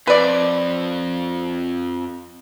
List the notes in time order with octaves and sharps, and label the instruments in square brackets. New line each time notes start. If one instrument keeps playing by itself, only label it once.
[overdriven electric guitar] F2 [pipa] B4 D5